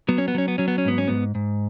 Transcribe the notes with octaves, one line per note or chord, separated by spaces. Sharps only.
F#3 B3
C#4
B3
F#3 C#4
B3
F#3 C#4
B3
C#4
G#2 B3
C#4
G#2 B3
G#2